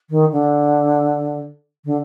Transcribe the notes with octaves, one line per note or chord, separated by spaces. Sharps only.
D#3
D3
D3